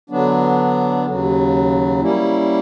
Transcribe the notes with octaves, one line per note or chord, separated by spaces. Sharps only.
D3 F#3 B3 D4
D#2 C#3 F#3
G3 A#3 C#4 E4